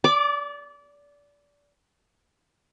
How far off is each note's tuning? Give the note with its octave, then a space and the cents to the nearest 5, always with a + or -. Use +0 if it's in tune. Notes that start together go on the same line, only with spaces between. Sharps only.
D5 -25 D6 +10